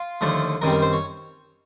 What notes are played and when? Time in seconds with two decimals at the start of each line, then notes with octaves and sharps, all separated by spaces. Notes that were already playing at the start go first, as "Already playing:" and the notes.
Already playing: F4
0.21 D#2 D3 F3 A3
0.61 F#2 D#3 G3 C4 A#4
0.72 A#4
0.82 C5
0.93 C#5